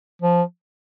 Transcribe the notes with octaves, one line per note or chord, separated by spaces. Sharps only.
F3